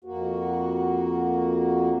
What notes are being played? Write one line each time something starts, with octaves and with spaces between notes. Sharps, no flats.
F2 A#3 F#4